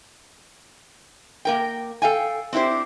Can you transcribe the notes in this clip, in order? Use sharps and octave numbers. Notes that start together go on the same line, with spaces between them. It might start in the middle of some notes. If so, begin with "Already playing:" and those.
A#3 A#4 G5
A4 F5 G5 G#5
C4 D4 E4 G4 C5